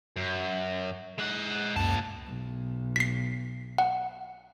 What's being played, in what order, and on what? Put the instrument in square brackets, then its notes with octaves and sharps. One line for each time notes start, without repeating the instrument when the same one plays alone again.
[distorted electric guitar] F#2
G#3 F#5
[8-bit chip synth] C#2 F#2 [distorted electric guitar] A#2 A5
[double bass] B1
[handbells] B6 C7
F#5